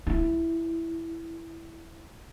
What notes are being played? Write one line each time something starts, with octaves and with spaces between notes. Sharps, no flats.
D#4 E4